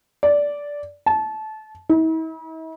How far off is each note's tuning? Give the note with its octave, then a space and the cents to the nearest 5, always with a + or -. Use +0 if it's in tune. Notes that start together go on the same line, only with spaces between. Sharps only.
D5 -10
A5 -20
E4 -45